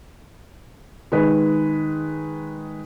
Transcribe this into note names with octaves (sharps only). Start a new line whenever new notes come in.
D#3 G#3 B4